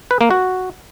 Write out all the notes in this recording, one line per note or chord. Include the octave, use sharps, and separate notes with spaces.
B4
A#3
F#4